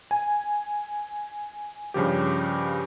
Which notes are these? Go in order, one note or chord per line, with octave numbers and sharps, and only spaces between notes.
G#5
G2 C#3 F3 G4